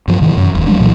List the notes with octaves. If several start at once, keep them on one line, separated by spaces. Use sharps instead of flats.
G2 F3
G#2 C3 D#3 E3
F#2
E1 D#2
F3 G3 G#3 D4
C2 A#2 E3 F#3